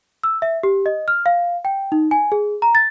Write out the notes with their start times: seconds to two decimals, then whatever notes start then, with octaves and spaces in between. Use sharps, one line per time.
0.23 E6
0.42 E5
0.63 G4
0.86 D#5
1.08 F6
1.26 F5
1.65 G5
1.92 D#4
2.11 G#5
2.32 G#4
2.62 A#5
2.75 A6